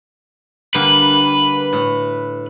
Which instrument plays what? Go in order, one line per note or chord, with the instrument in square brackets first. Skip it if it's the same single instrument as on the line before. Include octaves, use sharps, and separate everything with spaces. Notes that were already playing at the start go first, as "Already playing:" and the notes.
[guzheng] D3 G3 A#3 [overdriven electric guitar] B4
[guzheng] A2